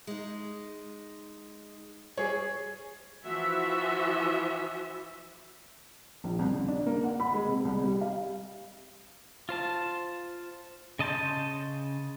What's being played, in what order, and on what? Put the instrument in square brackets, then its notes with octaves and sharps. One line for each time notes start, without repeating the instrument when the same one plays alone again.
[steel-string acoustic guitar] G#3 D#4
[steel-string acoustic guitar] G3 [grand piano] G#4 C#5
[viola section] E3 F3 F#4 E5
[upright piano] A#1
C2
C#3
D4
A#3
F#5
B5
G#3
C3
C2
G3
F5
[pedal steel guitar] F4 C5 A5
C#3 D#5 A5 C6 G6